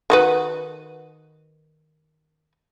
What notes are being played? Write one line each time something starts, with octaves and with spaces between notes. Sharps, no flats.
D#3 F#4 B4